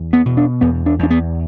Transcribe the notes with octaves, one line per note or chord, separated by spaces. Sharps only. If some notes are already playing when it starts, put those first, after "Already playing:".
Already playing: E2
B3
B2
D4
E2 B3
D4
E2 D4
B3